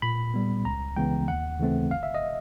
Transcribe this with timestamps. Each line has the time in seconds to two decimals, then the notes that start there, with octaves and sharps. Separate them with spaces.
0.02 A#2 B5
0.34 G3 B3
0.65 C#2 A#5
0.96 C#3 E3 G#3 B3 G5
1.28 D#2 F#5
1.59 C#3 E3 A3 C4
1.90 G1 F5
2.03 E5
2.14 D#5